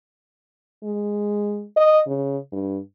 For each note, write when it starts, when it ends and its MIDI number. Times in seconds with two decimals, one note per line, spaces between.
0.84 1.64 56
1.76 2.00 75
2.07 2.38 49
2.52 2.78 43